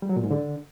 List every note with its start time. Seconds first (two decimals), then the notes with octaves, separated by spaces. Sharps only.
0.02 G3
0.09 F#3
0.16 A#2
0.24 G#2
0.31 D3